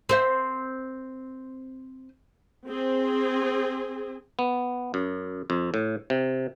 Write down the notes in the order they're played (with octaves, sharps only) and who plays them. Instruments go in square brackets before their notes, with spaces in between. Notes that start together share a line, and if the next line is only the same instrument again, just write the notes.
[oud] C4 C5 E5
[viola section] C4 G#4
[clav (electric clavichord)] B3
F#2
F2
A2
C3